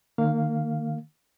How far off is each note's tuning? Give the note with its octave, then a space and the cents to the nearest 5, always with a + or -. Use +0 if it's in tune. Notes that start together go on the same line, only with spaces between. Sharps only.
D#3 -30 A#3 -30 F5 +0